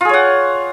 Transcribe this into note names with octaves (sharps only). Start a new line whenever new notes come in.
F4 G#4 C#5 F#5